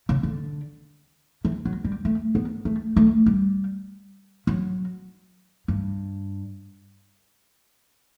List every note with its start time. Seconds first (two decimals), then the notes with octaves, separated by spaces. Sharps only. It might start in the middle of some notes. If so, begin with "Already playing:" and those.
0.09 C#3
0.23 D3
1.45 E3
1.65 F#3
1.84 G3
2.05 A3
2.35 B3
2.65 A3
2.96 A3
3.26 G3
4.47 F#3
5.68 G2